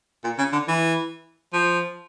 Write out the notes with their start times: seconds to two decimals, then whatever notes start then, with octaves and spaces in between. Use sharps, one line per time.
0.24 A#2
0.38 C#3
0.53 D3
0.68 E3
1.53 F3